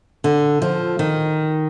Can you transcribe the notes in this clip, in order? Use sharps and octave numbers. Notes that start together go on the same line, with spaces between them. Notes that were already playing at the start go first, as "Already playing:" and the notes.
D3
F3
D#3